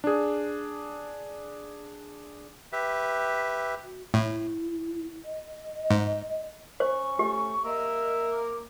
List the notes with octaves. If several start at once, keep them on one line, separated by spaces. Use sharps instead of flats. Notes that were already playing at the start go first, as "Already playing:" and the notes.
D4 G#4
G4 B4 E5
F#4
A2 E4
D#5
G#2
C#4 C5 C#6
A3 G4
A#3 A#4 D#5 E5
D6